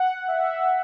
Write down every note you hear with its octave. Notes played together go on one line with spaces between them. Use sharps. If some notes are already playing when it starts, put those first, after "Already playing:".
Already playing: F#5
E5